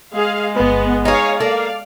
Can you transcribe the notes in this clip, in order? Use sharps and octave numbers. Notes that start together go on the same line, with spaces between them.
G#3 G#4 F5
G1 B3 B4
D#4 G#4 C#5 F5
A#3 A4 D5 F5